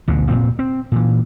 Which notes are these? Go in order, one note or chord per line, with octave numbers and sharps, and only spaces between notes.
A1 D2 B2 D3
F1 A#2 C4
C4
A#2 E3